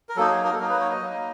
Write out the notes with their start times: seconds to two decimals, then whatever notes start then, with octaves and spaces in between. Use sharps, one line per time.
0.09 A#4
0.16 F#3 A#3 D#4 A4
0.31 G#4
0.45 A#4
0.54 A4
0.59 F#3 A#3 D#4 A#4
0.70 B4
0.80 C#5
0.91 D#5
1.02 F#3 A#3 D#4